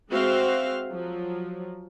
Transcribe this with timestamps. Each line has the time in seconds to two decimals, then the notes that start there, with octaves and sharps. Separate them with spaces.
0.12 G#3 C4 F#4 C5 E5 F5
0.90 F3 F#3